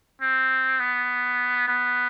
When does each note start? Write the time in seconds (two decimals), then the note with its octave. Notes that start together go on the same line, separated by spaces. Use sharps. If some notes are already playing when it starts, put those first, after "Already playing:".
0.21 C4
0.80 B3
1.68 B3